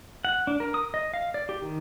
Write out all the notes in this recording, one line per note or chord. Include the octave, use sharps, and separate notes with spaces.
F#5
D4
A#4
D#6
D#5
F5
D5
G4
D#3